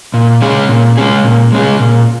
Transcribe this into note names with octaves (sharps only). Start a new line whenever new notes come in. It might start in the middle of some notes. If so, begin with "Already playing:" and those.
A#2
G#3 C#4 G#4
A#2
G#3 C#4 G#4
A#2
G#3 C#4 G#4
A#2